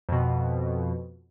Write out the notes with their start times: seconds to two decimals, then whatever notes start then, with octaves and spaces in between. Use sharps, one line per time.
0.09 F2 B2